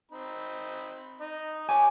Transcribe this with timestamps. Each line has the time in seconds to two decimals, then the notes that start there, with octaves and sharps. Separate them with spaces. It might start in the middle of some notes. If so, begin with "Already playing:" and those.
0.12 C4 D#4 B5
1.21 D#4 D#5
1.69 G4 C#5 G#5 D6